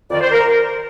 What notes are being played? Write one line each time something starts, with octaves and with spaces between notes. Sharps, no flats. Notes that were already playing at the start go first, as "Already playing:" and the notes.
F2 D#3 D5
C5
A#4